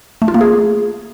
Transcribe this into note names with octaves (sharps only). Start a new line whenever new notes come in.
A3
F4
A#3
G#4